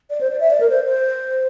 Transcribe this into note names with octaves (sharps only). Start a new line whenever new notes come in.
D5
C5
D5
E5
D5
A#4
C5
C5